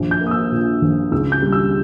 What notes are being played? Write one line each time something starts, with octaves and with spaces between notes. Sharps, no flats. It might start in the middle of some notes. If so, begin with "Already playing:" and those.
Already playing: A#1
G6
A#3
D#6
E6
A#2
A#1
C#2 E6
G6
G3
E6